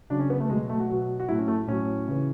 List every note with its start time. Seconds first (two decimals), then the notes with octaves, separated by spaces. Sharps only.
0.10 C#3 F#3 D4
0.20 C#4
0.30 B3
0.40 A3
0.50 B2 F#3 G#3
0.69 A3
0.80 F#4
0.89 B2 F#3
1.20 F#4
1.29 A2 F#3 E4
1.39 C#4
1.48 A3
1.67 A2 F#3 C#4
2.08 C#3 E3